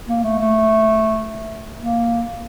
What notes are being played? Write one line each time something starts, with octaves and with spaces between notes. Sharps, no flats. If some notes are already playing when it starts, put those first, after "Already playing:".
A#3
A3
A3
A#3